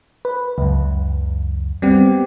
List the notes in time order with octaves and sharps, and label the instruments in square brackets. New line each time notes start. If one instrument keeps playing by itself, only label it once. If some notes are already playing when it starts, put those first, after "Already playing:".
[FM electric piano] B4
C#2 F#2
[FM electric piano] G3 B3 [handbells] C4 G4